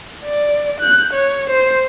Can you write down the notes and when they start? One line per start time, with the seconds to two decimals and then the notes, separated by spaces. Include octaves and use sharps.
0.25 D5
0.81 F#6 G6
1.14 C#5
1.50 C5